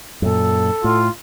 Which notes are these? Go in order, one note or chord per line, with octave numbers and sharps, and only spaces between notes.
F#2 A#2 A4
A2 F4